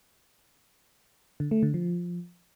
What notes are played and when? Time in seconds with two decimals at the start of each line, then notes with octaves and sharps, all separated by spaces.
1.40 D3
1.51 A3
1.63 D3
1.74 F3